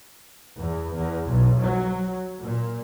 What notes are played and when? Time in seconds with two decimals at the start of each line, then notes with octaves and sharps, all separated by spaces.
0.58 E2
0.96 E2
1.28 B1
1.61 F#3
2.42 A#2